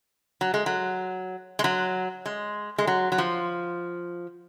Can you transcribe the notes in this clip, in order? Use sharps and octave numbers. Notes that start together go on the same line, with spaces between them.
F#3
G#3
F#3
G#3
F#3
G#3
G#3
F#3
F#3
F3